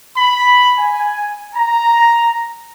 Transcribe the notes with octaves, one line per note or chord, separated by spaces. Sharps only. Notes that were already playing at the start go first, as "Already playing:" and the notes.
B5
G#5
A#5